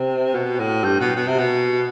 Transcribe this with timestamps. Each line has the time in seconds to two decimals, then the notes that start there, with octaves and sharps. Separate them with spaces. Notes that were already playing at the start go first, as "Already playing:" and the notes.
Already playing: C3
0.34 B2
0.59 A2
0.84 G2
1.00 B2
1.16 B2
1.27 C3
1.38 B2